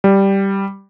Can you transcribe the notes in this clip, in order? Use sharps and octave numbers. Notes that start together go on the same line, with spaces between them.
G3